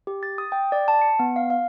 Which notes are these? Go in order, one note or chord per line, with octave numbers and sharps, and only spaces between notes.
G4
A6
D#6
G5
D5
A5
C#7
B3
F5
F5